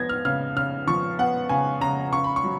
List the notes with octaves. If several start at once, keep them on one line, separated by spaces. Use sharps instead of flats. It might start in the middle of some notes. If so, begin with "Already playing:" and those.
Already playing: F3 B3 G#6 A#6
F6
C#3 F6
C#3 F6
F3 C#6
B3 F#5
C#3 G#5
C#3 A#5
C#3 C#6
B5
C#6
F#3